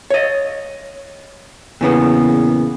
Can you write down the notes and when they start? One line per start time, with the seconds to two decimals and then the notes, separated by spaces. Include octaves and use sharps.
0.11 C#5 D#5
1.81 E2 A#2 C#3 B3